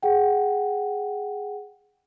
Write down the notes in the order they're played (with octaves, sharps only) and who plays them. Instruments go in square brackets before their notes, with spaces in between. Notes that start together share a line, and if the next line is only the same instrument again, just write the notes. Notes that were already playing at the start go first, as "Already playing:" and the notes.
[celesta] G#4 F#5 G5